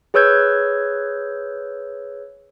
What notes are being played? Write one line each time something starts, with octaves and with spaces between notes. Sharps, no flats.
G#4 B4 C#5 E6 G6 G#6